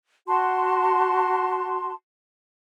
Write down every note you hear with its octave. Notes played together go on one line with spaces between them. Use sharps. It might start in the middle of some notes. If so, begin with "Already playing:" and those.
F#4 A5 C6